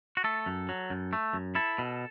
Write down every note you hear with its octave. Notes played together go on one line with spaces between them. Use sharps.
F#4
A3 A4
F#2
F#3
F#2
A3
F#2
E4 A4
B2